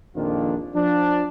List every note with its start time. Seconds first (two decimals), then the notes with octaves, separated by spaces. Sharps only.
0.16 A#1 F2 D#3 A#3 D4 F4
0.74 F3 D4